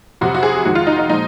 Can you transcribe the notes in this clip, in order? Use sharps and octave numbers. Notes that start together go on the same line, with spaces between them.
F2 C3 F#3 F#4
F#4
G#4
F2 D#3 G#3 F#4
F4
D#4
D#4
A#2 F3 G#3 D#4